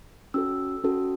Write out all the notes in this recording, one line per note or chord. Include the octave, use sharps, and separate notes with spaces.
C#4 F#4 A4 E6
C#4 F#4 A4